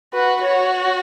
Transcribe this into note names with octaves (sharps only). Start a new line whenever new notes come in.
F#4 B4
F#4 C#5